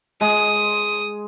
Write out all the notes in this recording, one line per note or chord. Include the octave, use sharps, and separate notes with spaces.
G#3 D#6